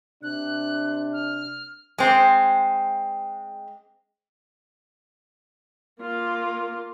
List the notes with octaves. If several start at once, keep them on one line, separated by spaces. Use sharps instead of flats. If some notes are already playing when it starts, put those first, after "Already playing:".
C3 D4 F#6
F6
G#3 C4
A#3 F4